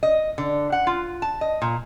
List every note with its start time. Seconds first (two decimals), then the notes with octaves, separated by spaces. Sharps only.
0.03 D#5
0.38 D3
0.72 F#5
0.87 F4
1.22 A5
1.41 D#5
1.62 A#2